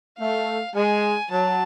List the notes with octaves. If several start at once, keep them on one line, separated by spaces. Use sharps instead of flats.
A3 F5
G#3 G#5
F#3 A5